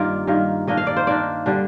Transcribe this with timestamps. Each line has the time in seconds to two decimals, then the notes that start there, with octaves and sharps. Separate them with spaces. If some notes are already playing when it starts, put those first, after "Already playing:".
Already playing: G2 D#3 A#3 F4 D5
0.27 G2 D#3 A#3 F4
0.67 D#3 A#3 D4 D#5
0.77 F5
0.87 D5
0.97 C5
1.07 D#3 A#3 D4 D5
1.46 D3 G3 D4